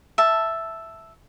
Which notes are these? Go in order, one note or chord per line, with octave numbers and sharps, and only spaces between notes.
E5 A5